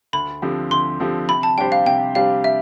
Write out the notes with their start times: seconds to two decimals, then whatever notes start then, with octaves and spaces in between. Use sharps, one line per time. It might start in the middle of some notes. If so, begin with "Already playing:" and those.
0.13 D2 B5
0.42 D3 F3 C4 G4
0.71 D2 C6
1.00 D3 F3 C4 G4
1.29 C3 B5
1.43 A5
1.58 G3 D4 G4 C5 G5
1.72 F5
1.86 C3 G5
2.15 G3 D4 G4 C5 F5
2.44 E5